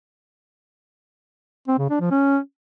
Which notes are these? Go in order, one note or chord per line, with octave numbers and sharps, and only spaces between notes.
C4
C#3
D4
F3
C#4